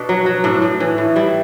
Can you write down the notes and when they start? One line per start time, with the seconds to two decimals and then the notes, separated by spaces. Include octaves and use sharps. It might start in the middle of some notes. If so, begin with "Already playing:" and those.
Already playing: B2 D4
0.09 F#3
0.26 F#3
0.44 A2 D4
0.62 A2
0.80 E3
0.98 A2
1.16 G3 E4